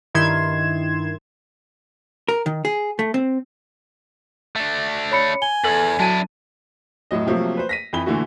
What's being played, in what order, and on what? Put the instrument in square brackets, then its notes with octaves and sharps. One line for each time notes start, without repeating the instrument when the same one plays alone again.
[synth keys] G2 D#3 E4 C6 G#6 E7
[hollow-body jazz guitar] A#4
D#3
G#4
A3
C4
[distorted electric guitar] A3 D4
[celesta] C#5 B5 C#7
[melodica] G#5 [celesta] G7
[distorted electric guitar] E2 [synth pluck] A4 [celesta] F#7
[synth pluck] F#3 [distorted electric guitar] D4 E4 [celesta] A5 D#7
[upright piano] F1 A2 F#3 D#5
C3 F3 F#3 A3 A#3
B4 C5
A#6 B6 D#7
F2 E3 B5 G7
A#2 D3 E3 A3 F#4